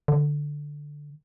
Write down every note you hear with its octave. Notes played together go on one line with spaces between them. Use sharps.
D3